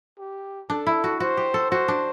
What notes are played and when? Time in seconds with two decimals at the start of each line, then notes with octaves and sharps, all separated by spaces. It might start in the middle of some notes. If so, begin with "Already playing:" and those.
0.18 G4
0.70 D4 A4
0.87 E4
1.04 F#4
1.20 F#4 C5
1.37 G4
1.54 A4
1.71 F#4 C5
1.88 D4